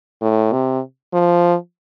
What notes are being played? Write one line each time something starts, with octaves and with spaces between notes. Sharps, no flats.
A2
C3
F3